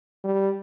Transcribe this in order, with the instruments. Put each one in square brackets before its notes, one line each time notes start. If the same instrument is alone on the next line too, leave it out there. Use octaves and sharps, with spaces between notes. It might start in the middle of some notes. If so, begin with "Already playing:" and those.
[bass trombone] G3